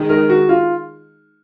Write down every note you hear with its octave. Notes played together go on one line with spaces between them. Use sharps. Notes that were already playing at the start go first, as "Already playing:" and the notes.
Already playing: D#3 G#3 D#4
A#4
F#4
F4